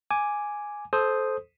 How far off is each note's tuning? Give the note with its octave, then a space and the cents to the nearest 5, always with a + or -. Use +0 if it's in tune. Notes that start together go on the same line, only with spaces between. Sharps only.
G#5 +0 D6 +0
A4 -20 C5 +0 D#6 +0